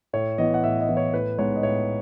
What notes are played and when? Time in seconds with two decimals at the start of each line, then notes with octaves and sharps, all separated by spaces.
0.13 A2 C#5
0.38 E3 B3 D#5
0.54 F#5
0.64 A2 E5
0.80 D#5
0.88 E3 B3
0.97 C#5
1.13 A2 B4
1.39 G#3 B3 D#4 C#5
1.56 D#5
1.63 A2 C#5